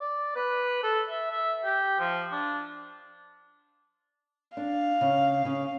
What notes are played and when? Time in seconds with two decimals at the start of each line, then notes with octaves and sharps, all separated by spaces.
0.01 D5
0.36 B4
0.83 A4
1.09 E5
1.31 E5
1.65 G4
2.00 F3
2.32 D4
4.57 D4 F5
5.01 C#3
5.45 C#3